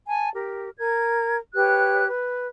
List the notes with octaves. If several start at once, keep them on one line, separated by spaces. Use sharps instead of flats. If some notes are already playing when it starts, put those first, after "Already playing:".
G#5 A5
G4 A#4
A#4 G#6
G4 B4 C#5 F#6
B4